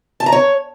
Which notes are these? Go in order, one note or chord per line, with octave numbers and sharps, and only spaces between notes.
A5
A#5
C#5